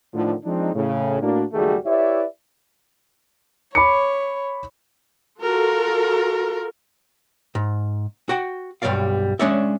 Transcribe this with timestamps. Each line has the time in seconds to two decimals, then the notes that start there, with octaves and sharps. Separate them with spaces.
0.14 A2 D3 D#3 F3
0.44 F3 G#3 C4 D4 D#4
0.74 A2 C#3
1.22 A2 A#3 D4 F#4
1.53 F#1 D#3 G3 A3 F#4 G#4
1.85 E4 G4 B4 C#5 D5 E5
3.75 C#5 B5 D6 C#7
5.40 F4 F#4 A4 A#4
7.55 G#2
8.29 F#4 F#5 G5
8.82 B1 G2 G3 C#5 D5 F5
9.39 G#3 C#4 D4 C#5 D5 E5